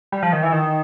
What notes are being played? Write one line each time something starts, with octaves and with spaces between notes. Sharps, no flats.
G3
F3
D#3
E3
D#3